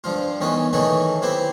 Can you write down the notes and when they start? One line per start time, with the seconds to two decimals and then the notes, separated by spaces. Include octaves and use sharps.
0.04 G2 F3 F4
0.40 E2 D#3 C#4 B4
0.73 D#3 E3 F#3 A3 D#4 F#4
1.22 C4 E4 G4 B4